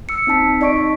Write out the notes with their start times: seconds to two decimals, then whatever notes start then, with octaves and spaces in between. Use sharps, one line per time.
0.09 E6 C#7
0.27 C4 D#4 A5 B6
0.61 D#4 D5 D#5 C#6 B6 D7